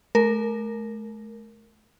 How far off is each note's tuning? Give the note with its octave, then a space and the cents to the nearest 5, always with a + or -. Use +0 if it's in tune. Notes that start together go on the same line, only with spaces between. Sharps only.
A3 -40 A#4 +0